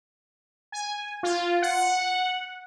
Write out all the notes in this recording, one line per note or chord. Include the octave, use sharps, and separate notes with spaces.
G#5
F4
F#5